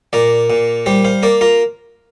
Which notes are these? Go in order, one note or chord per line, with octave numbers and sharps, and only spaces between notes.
A#2 A#4 D5
A#2
G3 G4 C5
C5 F5
A#3 A#4 D5
F4 A#4